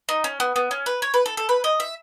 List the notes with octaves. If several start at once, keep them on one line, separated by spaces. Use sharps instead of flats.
D#4
C#4
B3
B3
C#4
B4
C#5
B4
A4
A4
B4
D#5
E5